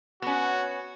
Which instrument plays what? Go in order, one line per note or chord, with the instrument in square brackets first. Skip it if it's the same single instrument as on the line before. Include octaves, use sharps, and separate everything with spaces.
[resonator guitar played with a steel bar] B3 C#4 [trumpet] F#4